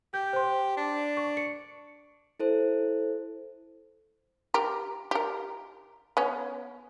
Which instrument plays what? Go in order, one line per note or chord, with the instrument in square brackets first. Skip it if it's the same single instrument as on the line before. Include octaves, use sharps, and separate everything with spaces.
[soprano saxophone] G4 [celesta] G6
[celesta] C5 C6
[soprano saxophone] D4
[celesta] C#6
C#7
[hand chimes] E4 A4 C5
[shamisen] G4 A#4
G4 A#4
B3 C#4